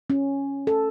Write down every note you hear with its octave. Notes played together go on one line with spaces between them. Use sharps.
C#4
A4